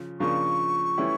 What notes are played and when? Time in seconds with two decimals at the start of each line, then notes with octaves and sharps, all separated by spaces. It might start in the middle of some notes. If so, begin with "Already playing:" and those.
Already playing: C#3 F3
0.20 C#3 F3 A#3 D4 C#6
0.98 E3 A3 C#4 E4 G4